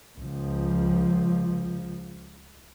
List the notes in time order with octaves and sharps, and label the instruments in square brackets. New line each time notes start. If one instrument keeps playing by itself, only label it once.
[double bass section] C#2 F3